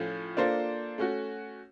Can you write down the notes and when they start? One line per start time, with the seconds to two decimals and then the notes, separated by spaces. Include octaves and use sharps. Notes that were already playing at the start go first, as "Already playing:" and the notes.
Already playing: A2 F3 A3 C#4 F4
0.37 A#3 D4 F4 A4 C5
0.98 A3 C#4 F#4